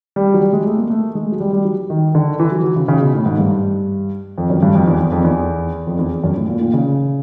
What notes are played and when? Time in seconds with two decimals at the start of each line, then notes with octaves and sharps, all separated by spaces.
0.16 G3
0.34 F#3
0.41 G3
0.53 G#3
0.66 A3
0.78 A#3
0.90 A3
1.15 G#3
1.32 F#3
1.40 G3
1.53 G3
1.65 F#3
1.90 D#3
2.15 D3
2.40 E3
2.52 F#3
2.64 F#3
2.76 C#3
2.88 C#3
3.02 B2
3.14 A2
3.26 G#2
3.39 G2
4.38 F2
4.50 F#2
4.63 G2
4.75 F2
4.87 E2
5.00 E2
5.12 F2
5.24 E2
5.87 F2
5.99 E2
6.24 F#2
6.36 A2
6.48 A#2
6.61 A#2
6.73 C#3